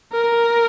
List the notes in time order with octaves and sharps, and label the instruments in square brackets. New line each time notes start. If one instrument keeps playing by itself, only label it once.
[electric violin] A#4